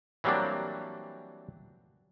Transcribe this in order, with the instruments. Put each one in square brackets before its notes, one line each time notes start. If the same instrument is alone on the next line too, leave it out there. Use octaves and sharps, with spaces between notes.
[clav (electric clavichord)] E3 F#3 G3 A#3 C4 D4